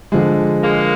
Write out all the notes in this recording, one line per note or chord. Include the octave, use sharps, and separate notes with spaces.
D3 F3 G#3
G#3 A#3